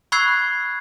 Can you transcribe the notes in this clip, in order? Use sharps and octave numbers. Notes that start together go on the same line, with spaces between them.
B5 C#6 E6 F#6 G#6 C7